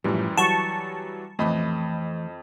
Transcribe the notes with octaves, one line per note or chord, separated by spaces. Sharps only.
F#2 A2 E3 F3 G3
E3 F#3 G3 F#5 A5 C#6
F2 E3 A3 D#5 B5